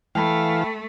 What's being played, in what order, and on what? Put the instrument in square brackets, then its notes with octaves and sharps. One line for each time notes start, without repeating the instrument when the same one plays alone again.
[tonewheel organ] E3 F5 [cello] A3 [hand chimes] G5 A5 B5